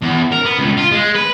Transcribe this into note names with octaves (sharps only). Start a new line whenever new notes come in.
E2
A#4
B3
C#2
F4
G#3
B4